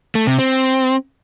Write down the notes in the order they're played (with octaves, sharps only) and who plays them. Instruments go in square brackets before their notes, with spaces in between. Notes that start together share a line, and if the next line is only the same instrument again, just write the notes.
[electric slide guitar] A3
C3
C4